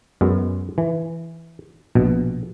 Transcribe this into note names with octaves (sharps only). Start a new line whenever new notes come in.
F#2 G#3 B3
E3
A#1 B2